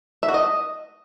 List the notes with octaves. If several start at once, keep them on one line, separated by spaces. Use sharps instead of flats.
E5
F#4
D#5